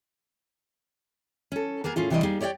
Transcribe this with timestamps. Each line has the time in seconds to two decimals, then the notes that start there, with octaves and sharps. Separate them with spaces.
1.52 C#4 A4
1.84 A#3 B3 G#4 A#4
1.96 A2 C#4 F4 G#4
2.10 C3 E3 G3 C4 D5 D#5
2.23 G3 A#3 D#4 G#4
2.41 G4 C#5 D5 E5 G5